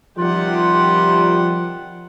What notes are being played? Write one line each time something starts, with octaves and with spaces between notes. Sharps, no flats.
C3 D#3 F3 G3 F4 G4 F#5